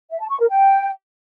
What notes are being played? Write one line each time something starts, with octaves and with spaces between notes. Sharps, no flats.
E5
A5
C#6
A#4
G5